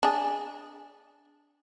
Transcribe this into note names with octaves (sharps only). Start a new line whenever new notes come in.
D4 G#4